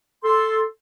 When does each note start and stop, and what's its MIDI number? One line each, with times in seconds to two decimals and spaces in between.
0.24 0.62 69
0.24 0.62 84